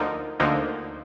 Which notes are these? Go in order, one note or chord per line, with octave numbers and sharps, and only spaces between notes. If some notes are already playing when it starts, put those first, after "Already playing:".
Already playing: D2 D3 F3 A#3 D#4
D2 D3 F3 A#3 D#4